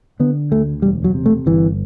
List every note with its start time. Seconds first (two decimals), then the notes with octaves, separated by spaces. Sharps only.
0.20 D3 B3
0.51 D2 A3
0.82 E1 G3
1.04 F#3
1.14 C3
1.26 A3
1.46 G1 E3